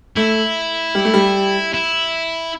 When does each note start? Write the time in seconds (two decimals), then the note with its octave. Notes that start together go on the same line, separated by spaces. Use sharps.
0.16 A3 E4
0.95 G3
1.05 A3
1.14 G3
1.74 E4